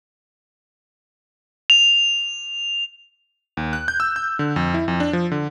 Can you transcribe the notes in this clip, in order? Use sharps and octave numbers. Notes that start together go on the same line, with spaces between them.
F7
D#2
F#6
G6
E6
G6
D3
F2
E4
F2
D4
F3
D3